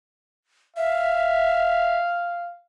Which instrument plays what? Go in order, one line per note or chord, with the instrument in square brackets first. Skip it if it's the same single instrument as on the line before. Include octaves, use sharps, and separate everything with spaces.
[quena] E5 [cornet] F5